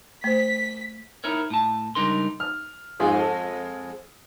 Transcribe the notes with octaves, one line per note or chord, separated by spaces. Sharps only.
A3 C5 B6
D#4 E4 A#4 C#5
A2 A5
C#2 G3 D4 D#4 A#4 C6
F6
F2 G#2 G#3 F4 G#4
A4